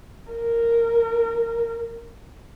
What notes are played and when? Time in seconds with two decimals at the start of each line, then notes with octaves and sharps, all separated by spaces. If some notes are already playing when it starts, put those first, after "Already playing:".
0.31 A#4